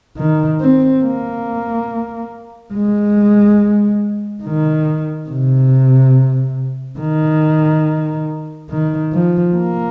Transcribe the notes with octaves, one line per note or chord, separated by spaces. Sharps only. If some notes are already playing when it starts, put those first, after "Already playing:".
D#3
C4
A#3
G#3
D#3
C3
D#3
D#3
F3
A#3